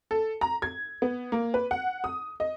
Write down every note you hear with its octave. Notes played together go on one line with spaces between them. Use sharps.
A4
A#5
G#6
B3
A#3
B4
F#5
D#6
D#5